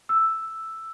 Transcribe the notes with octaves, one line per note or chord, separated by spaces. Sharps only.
E6